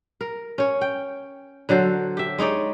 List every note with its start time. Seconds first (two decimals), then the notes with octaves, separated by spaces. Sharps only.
0.21 A#4
0.58 C#4 C#5
0.81 G5
1.69 D3 F#3 A4 C5
2.17 G4 E5
2.39 G#3 D#4 C#5 D5